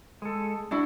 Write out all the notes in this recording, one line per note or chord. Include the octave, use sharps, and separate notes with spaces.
G#3 A4
D4 E4 F#4